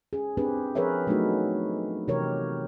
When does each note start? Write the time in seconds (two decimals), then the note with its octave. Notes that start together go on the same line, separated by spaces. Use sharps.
0.13 C#4 G#4
0.37 C4 D4 G4 G#4 B4
0.75 F3 G#4 A#4 B4 C#5 E5
1.07 F#3 A3 B3 D4 D#4 F#4
2.08 C3 E3 G4 A#4 C#5